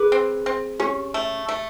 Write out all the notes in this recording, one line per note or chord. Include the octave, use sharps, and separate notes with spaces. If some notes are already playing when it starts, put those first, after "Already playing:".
Already playing: G#4 B4
C4
C4
C#4 G4
A3
A3